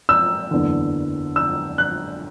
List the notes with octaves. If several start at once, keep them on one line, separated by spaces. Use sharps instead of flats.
E6
F#1 E2 D3
E6
F#6